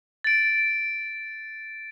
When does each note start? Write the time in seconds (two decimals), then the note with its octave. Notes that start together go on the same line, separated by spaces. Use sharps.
0.24 A6 D7